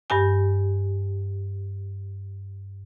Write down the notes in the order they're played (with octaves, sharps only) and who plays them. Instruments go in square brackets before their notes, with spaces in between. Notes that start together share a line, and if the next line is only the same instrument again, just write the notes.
[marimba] G2 G4 G#5